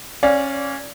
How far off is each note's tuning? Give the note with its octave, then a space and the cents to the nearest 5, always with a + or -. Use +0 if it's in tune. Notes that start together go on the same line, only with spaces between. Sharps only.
C#4 -15 D5 -25 F5 +20